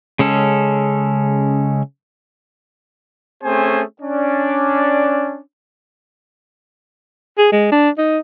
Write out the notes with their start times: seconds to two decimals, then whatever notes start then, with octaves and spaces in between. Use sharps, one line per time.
0.19 C#3 G#3 C#4 A4
3.44 A3 C4 C#4 G#4 C5 G#5
4.02 C#4 D4 D5
7.38 G#4
7.53 G#3
7.72 D4
7.98 D#4